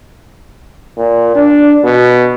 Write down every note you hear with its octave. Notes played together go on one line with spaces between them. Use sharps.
A#2
D4
B2